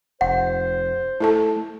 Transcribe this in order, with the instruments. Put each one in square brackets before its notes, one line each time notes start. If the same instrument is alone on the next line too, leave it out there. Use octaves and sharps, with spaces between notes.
[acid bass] F1 [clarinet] C5 [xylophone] F#5
[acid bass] A3 [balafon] E4 A4 A5